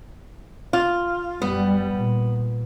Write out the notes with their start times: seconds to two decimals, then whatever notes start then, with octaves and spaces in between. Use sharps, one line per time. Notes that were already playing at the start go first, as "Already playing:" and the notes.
0.73 F4
1.42 F#2 G3 B3
1.95 A#2